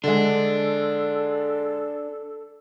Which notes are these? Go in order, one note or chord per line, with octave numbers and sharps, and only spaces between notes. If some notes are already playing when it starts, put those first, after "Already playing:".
D3 G#3 D4 A4